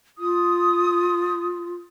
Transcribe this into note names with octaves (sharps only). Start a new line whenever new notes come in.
F4 D#6